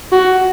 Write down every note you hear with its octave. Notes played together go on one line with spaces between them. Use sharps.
F#4